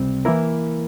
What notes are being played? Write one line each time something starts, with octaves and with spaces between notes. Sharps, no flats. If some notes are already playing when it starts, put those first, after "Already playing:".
Already playing: C#2 C3 G3 C4
E3 A#3 E4 A#4